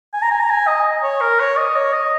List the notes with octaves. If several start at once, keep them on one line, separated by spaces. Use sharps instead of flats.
G#5
A#5
G#5
A#5
G#5
D#5
C#5
A#4
C#5
D#5
C#5
D#5